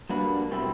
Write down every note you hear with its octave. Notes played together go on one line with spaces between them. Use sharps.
G3 A#3 D4 F#4 B4
B2 G3 C4 E4